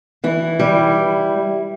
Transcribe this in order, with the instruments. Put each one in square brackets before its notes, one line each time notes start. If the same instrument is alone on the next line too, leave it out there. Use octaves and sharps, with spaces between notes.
[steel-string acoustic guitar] E3 E4
G3